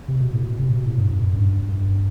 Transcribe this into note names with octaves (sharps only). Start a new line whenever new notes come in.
C3
B2
A2
B2
C3
B2
A2
G2
F#2
G2
G2